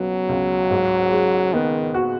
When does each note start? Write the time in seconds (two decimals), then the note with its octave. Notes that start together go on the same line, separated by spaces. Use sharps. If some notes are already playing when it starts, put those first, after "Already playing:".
Already playing: C#2 B2 F#3 B3
0.29 C#2
0.71 G#2
1.12 G#3
1.53 D#3 B3
1.94 F#4